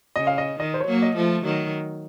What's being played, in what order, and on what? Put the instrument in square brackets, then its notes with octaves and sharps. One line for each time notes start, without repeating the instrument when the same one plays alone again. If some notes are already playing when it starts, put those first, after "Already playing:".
[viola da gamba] C#3 [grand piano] D#5
[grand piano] F5
D#5
[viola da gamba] D#3 [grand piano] D#5
[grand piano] C5
C#5
[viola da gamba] F#3 A#3
[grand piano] D#5
[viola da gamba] F3 A3
D#3 F#3